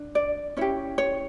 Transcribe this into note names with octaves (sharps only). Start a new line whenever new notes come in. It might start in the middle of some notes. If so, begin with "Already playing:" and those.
Already playing: D4
D5
C#4 E4 G4 C#5
C#5